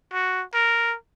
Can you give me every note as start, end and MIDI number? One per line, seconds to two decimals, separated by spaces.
0.13 0.43 66
0.54 0.95 70